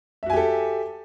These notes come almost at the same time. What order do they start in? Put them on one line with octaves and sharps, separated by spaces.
E5 F#4 G#5 G4 A4